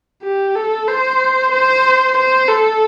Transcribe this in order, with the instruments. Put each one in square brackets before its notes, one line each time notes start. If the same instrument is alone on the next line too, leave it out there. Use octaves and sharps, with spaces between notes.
[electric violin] G4
A4
C5
C5
C5
A4